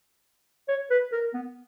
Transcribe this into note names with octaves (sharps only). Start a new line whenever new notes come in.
C#5
B4
A#4
B3